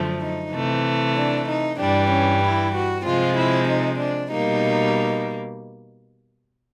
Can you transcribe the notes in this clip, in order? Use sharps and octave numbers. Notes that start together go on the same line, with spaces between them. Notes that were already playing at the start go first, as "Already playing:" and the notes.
Already playing: F#2 D3 F3 A3
D#4
C3 E3 A3
D4
D#4
G2 E3 G3 D4
C#4
E4
F#4
C3 F3 G#3 F4
E4
D#4
D4
B2 G3 A#3 D#4